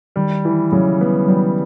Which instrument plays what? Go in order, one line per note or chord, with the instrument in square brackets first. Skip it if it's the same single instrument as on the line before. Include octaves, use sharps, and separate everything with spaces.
[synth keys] D#3 [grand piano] G3
[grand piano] E3
[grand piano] C#3 [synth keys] F#3
[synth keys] G3 [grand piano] B3
[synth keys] F#3 [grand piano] G3